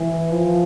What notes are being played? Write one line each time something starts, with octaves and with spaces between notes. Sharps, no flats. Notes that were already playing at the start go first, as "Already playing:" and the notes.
Already playing: E3
F3